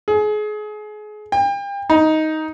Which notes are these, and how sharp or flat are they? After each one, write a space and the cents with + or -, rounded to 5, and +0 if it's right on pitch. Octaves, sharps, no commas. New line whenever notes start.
G#4 +30
G5 +35
D#4 +10